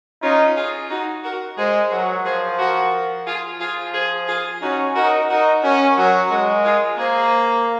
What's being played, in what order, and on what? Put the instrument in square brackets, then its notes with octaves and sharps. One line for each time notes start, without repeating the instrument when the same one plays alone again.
[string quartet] C#4 F4 [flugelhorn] D#4
[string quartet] F4 G#4
D#4 F#4
F#4 A#4
[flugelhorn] G#3 [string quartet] G#4 C5
[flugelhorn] F#3 [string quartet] F#4 A#4
[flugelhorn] F3 [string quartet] G#4 C5
[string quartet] F#4 A#4
F4 G#4
[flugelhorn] F3 [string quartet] F4 G#4
[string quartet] G#4 C5
F4 G#4
[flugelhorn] C#4 [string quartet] D#4 F#4
[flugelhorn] D#4 [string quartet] F#4 A#4
[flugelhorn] D#4 [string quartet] F#4 A#4
[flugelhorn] C#4 [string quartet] F#4 A#4
[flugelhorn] F#3 [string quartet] F#4 A#4
[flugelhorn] G#3 [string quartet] F#4 A#4
[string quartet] F4 G#4
[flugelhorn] A#3 [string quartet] G#4 C5